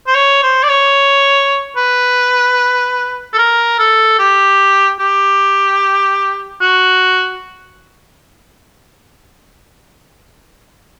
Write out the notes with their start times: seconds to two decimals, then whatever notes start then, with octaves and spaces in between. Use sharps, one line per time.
0.07 C5
0.15 C#5
0.43 C5
0.63 D5
0.69 C#5
1.77 B4
3.33 A4
3.38 A#4
3.79 A4
4.19 G4
5.00 G4
6.61 F#4